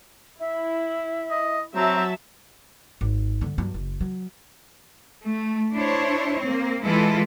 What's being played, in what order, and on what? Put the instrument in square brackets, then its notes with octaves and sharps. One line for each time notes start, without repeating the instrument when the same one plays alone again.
[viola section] E4 [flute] E5
[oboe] D#5
[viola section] F#3 E5 A5 [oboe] C4 [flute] A#5
[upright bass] G#1
G2 D3
G2 F#3
F#1
F#3
[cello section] A3
D4 E4 C5 C#5
A#3 C4
E3 G#3 E4 F4 A4 B4